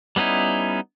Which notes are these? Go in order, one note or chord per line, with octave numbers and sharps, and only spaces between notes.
G3 B3 C#4 D#4 E4